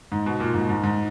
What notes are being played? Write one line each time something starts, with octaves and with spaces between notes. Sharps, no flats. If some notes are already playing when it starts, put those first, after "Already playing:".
G#2
B2
A#2
G#2
G#2
G#2